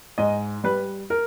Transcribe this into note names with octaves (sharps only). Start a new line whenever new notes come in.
G#2 D#5
G3 B4
A#4